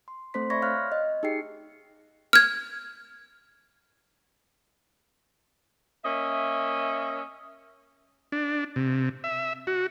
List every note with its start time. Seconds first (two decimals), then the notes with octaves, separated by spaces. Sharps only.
0.08 C6
0.34 A3 C4 A4 C5 C6 B6
0.50 D5 E5 B5 C#6 G#6 A#6
0.62 C#5 D5 F5 C6 F6 F#6
0.92 D#5
1.23 D#4 G4 G#4 G5 C7 C#7
2.33 F6 G#6
6.04 A#3 C#4 D#5 E5
8.32 D4
8.76 C3
9.24 E5
9.67 F#4